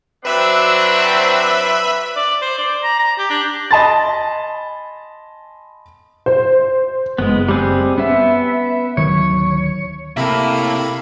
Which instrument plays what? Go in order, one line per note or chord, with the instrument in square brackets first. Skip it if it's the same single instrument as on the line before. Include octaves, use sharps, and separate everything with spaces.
[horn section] F#3 C4 D4 [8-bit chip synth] B4 E5 B5
[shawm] D5
C5
D5
A#5
A#5
G4
D4
[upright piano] D#5 G#5 A5 B5 C6 A6
[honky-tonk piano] C5
[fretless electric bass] F#1 [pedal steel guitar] G#3 B3
[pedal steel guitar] G3 C4 G#4
[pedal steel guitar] B3 E5 [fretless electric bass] C#4
[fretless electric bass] D1 D#3 F#3 [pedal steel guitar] C#5
[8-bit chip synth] C3 C4 B5 [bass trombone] A#3 [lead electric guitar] E4 A4